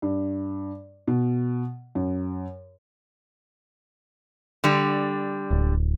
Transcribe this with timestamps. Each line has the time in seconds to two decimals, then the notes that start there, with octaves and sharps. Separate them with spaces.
0.02 G2
1.07 B2
1.95 F#2
4.64 D3 G3
5.51 D1